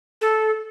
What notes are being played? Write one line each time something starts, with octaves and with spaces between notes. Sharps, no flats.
A4